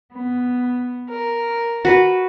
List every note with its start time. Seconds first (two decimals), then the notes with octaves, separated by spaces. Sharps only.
0.14 B3
1.10 A#4
1.85 F#4 B4